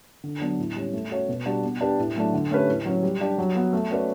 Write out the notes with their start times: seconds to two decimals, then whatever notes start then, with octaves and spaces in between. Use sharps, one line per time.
0.23 D3
0.41 F#3 B3 D4
0.59 A2
0.76 G3 C#4
0.93 A3
1.11 C#4 F#4 C#5
1.28 B2
1.45 G3 D4 F#4
1.63 B3
1.81 D4 G4 B4
1.99 A2
2.16 F#3 A3 D4
2.33 D3
2.51 A3 C#4 G4 B4
2.69 A2
2.85 F#3 C#4
3.03 G3
3.20 D4 G4 D5
3.38 F#3
3.55 B3 F#4
3.73 A3
3.90 C#4 F#4 B4 D5